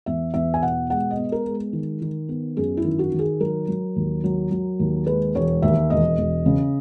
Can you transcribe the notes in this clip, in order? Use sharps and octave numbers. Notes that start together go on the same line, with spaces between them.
E2 E5
E2 E5
G#5
B2 F#5
G#3 F#5
D#5
B3
A#4
G#3
D#3
D#3
B3
F#2 G#4
E4
D#3
F#4
D#3
G#4
F#3 A#4
F#3
D#2
F#3
F#3
D#2
G#3 B4
E1 C#5
D#2 E5
E1 D#5
E1
C#3